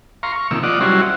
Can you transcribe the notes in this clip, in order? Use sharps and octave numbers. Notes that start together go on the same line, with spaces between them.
F5 A#5 C6 C#6
C#6
C3 D#3 F3 A#3 E6
F4 D5 D#5 F#5
F#3 G3 C#4 E4 F#4 C5